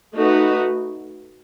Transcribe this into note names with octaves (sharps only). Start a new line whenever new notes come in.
A3 D#4 F#4 B4